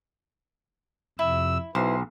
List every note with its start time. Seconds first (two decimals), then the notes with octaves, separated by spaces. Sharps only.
1.19 F2 C3 E4 E6
1.75 B1 E4 B4 C5